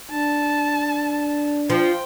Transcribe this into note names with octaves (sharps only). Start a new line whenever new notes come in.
D4 A5
F3 G5